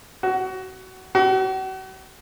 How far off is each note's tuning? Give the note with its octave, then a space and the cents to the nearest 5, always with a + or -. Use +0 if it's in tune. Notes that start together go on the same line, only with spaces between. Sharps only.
F#4 +20
F#4 +40